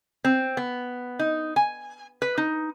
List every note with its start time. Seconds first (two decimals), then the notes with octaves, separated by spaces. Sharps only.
0.24 C4
0.57 B3
1.19 D#4
1.56 G#5
2.22 B4
2.38 D#4